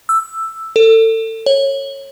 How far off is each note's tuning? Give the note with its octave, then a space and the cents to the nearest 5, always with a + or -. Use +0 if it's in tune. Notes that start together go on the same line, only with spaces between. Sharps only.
E6 +5
A4 +30
C#5 -15